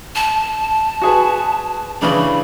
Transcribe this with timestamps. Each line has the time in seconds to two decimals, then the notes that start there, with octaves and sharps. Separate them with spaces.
0.15 A5
1.02 F#4 G#4 B4
2.02 C#3 E3 D4 B5